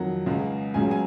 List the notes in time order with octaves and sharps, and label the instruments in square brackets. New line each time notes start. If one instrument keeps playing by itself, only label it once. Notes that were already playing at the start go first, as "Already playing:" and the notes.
Already playing: [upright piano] F2 D#3 F#3 F#5
C#2 C#3 G#3
C#2 C#3 F#3 G#5
G#5